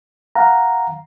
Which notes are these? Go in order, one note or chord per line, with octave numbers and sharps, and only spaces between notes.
F5 F#5 A#5